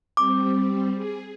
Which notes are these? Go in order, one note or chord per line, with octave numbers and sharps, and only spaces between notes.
G3 C4 D6
G#4